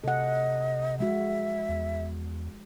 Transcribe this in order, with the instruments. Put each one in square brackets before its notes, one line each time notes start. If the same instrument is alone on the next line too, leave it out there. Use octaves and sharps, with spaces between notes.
[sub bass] C3 [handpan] A4 F#5 [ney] D#5
[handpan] F3 G#3 F#4 [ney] E5
[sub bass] E2